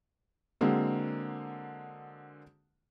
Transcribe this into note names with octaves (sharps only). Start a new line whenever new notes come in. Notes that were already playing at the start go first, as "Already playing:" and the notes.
D3 F#3 G#3 A#3 C4